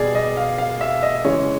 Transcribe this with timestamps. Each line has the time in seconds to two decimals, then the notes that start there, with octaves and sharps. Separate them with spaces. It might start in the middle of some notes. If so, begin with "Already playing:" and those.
Already playing: B2 G3 G#4 D5
0.15 D#5
0.37 F5
0.58 F5
0.81 E5
1.03 D#5
1.24 C#3 E3 G#3 C#5